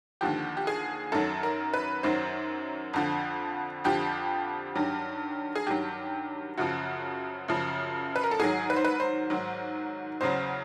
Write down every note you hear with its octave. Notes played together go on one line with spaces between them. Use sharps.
D#2 D3 F3 G4
G4
G#4
F#2 D#3 F#3 A4
A#4
B4
F#2 D#3 F#3 C5
F2 D3 F3
F2 D3 F3 G4
G2 D#3 F#3
G#4
G2 D#3 F#3 G4
F#2 C#3 F3 F#4
F#2 C#3 F3
B4
A#4
A4
G#2 D#3 F#3 G#4
B4
C5
B4
C5
G#2 D#3 F#3
E2 C#3 F#3 C5